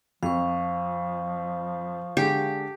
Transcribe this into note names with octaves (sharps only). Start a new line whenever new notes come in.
F2 F3 F5 C#6
D3 G#3 G4